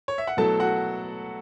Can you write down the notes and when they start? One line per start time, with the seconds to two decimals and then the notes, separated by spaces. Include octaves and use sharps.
0.08 C#5
0.18 E5
0.27 F#5
0.37 B2 F#3 A3 E4 A4 A5
0.60 F#4 F#5